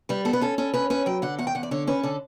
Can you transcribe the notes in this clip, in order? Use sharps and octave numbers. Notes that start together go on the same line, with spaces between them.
G3 B4
B3 A4
B4
C#4 A4
C#4 A4
C#4 B4
C#4 B4
F#3 G5
D3 F#5
E2 F#5
G5
E2 F#5
D5
D3 C#5
C#4 B4
D3 A4